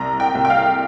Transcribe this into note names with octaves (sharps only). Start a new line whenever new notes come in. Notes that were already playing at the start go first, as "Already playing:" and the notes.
Already playing: C2 A#5
G5
C2
G5
F5